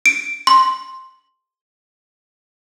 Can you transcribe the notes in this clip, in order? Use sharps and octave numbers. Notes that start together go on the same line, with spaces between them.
D7
C6